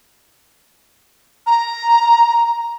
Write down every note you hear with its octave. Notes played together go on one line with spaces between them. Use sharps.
A#5